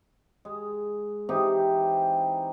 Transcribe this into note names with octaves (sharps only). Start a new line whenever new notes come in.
G#3
E3 C4 D#4 G4